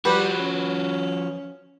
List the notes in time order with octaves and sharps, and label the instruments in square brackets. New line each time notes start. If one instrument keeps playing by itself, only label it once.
[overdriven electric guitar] F3 F#4 [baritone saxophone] G3 [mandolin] B4
[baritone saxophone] C#4